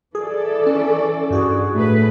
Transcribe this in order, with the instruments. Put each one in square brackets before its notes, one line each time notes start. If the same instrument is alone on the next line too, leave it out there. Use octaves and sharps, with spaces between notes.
[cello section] E3 A4 D5 [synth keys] G#4
[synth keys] C#4
G2 F#4 G#4
[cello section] A2 A3 B4